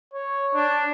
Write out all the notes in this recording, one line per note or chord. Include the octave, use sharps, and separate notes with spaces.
C#5
D4